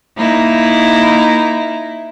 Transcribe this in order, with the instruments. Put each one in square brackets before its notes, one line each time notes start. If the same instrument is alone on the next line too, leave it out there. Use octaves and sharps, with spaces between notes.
[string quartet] A#3 D#4 E4